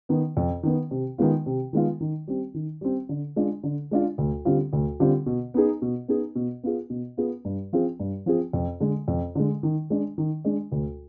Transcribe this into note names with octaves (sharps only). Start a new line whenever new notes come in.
D#3 B3
F2
D#3 B3
C3
D#3 G#3 B3 F4
C3
D#3 G#3 B3 F4
D#3
G3 C4
D#3
G3 C4
D3
G#3 D4 F4
D3
G#3 D4 F4
D2
D3 G3 C4 F4
D2
D3 G3 C4 F4
B2
B3 D#4 G#4
B2
B3 D#4 G#4
B2
B3 F4 G#4
B2
B3 F4 G#4
G2
F3 C4 F4 G#4
G2
F3 C4 F4 G#4
F2
D3 G#3
F2
D3 G#3
D#3
G#3 D4
D#3
G#3 D4
D2